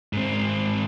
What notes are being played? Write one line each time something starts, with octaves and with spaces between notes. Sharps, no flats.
G#2 C4